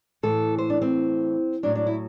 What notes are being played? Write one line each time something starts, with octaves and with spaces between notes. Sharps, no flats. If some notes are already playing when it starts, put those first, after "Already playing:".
A2 E3 A4
C5
D4
C4
A2 F#3 D4
D4
E4